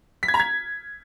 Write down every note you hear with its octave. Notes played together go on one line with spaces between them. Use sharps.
B6
G#6
A#5
G#6